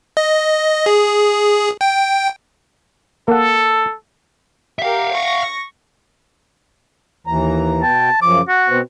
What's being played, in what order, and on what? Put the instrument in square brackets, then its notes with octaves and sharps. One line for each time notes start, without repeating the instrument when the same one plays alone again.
[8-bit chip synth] D#5
G#4
G5
[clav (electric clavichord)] A#3 F#5 [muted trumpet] A4
[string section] G4 A#4 [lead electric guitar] E5 F5
[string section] C#6 A#6
[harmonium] D#2 E3 A#5
[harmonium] B2 B3 G5 [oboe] A5
[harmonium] F#2 C#3 F3 [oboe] D6
[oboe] F#4 [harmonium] F#5
[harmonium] B2 B3 C4